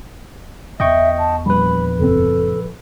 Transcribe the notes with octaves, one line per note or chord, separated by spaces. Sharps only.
E2 D#5 E5 G5 C#6
A5
A#1 G3 B4 B5
F#1 C3 C4 A4